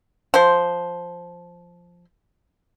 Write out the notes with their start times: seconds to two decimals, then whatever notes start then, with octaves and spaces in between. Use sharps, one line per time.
0.34 F3 C5